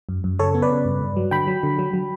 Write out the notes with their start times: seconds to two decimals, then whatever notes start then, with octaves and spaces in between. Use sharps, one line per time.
0.09 F#2
0.24 F#2
0.39 C#3 A4 C#5
0.54 B3
0.62 B4 D5
0.70 C#3
0.85 G2
1.01 G2
1.16 F#3
1.31 D3 G5 B5
1.47 F#3
1.63 D3
1.79 F#3
1.93 F#3